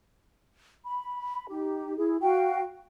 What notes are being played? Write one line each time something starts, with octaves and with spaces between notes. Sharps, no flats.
B5
D#4 G4
E4 G#4
F#4 F5 G5